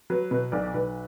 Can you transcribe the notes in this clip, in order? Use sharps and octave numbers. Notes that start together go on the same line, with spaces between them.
F#3 B4
B2 B4
B1 D5
B1 B4